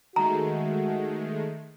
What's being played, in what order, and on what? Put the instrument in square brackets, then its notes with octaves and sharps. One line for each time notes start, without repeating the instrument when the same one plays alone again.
[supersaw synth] D#3 G#3 A3 [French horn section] F#4 [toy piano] A#5